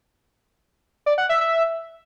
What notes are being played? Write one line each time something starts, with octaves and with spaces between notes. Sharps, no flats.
D5
F#5
E5
E5